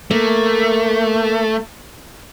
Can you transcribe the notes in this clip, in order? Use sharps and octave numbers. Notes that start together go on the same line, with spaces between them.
A3 A#3